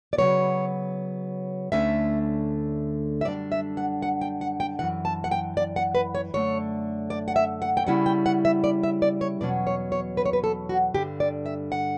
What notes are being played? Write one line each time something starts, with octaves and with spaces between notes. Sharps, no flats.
D5
C#3 F#3 B3 C#5
D2 D3 A3 C#4 E5
E5
F#2 D3 G3 D4 D5
E5
F#5
F#5
G5
F#5
G5
F#2 C#3 E3 F#5
A5
F#5
G5
D5
F#5
B4
C#5
F#2 D3 A3 C#5
D5
F#5
E5
F#5
G5
C#3 G3 C#4 E4 F#5
G5
F#5
E5
D5
E5
D5
C#5
E2 B2 F#3 C#4 D5
C#5
C#5
B4
C#5
B4
A4
F#4
G2 D3 G3 G4
D5
E5
F#5